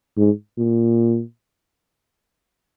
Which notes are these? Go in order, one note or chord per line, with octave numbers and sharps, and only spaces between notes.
G#2
A#2